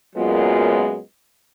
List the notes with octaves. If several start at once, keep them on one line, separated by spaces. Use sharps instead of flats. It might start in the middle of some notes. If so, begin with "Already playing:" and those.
F#2 A#2 F#3 G#3 B3 F4